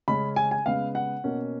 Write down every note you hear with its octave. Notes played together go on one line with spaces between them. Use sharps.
C#3 G#3 C#4 B5
G#5
G#5
C#3 G#3 B3 F5
F#5
B2 A#3 C#4